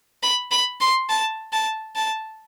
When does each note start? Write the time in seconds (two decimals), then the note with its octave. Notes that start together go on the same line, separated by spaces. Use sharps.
0.23 B5
0.52 B5
0.81 C6
1.10 A5
1.53 A5
1.96 A5